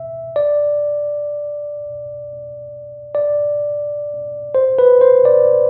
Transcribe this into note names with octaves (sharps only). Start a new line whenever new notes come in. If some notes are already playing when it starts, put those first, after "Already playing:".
Already playing: E5
D5
D5
C5
B4
C5
D5